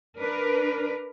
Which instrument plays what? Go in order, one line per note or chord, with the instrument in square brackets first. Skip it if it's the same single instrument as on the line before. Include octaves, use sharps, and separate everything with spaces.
[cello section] D4 A#4 B4